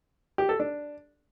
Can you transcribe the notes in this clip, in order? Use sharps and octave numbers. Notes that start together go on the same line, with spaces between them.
G4
A4
D4